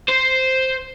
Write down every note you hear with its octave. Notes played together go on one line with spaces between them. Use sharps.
C5